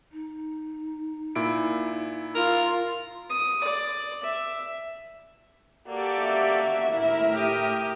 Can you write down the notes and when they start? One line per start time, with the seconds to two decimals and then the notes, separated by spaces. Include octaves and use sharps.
0.11 D#4
1.35 A#2 E4 D7
2.35 F4 A#4
3.30 D#6
3.64 D5
4.23 E5
5.87 A#3 F#4 G4 A4 D5
6.21 E5
6.92 A2 E4 A#4
7.35 G4 D#6